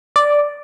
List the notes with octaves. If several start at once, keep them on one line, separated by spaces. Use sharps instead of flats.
D5